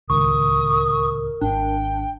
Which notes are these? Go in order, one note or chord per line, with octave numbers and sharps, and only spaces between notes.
D1 C#2 D#3 A#4 C#6 D#6
G#1 D4 G5